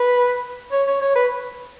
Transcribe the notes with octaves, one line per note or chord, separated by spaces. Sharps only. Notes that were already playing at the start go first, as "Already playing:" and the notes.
Already playing: B4
C#5
C#5
C#5
B4